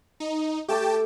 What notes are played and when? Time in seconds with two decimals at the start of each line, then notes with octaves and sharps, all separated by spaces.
0.20 D#4
0.68 A3 G4 G5 A5 C#6 D6